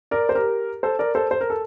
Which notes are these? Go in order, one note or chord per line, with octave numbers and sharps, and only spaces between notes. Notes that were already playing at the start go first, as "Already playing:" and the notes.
A#4 D5
C5
G4 A#4
A4 C5
A#4 D5
A4 C5
C5
A#4
A4